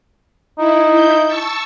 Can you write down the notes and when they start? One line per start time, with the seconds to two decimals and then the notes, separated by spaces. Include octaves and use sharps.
0.58 D#4 E4
0.90 E4 G6
1.27 A5 C#6 E6